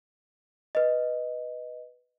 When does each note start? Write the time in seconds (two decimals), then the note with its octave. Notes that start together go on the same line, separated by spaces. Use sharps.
0.75 B4 D#5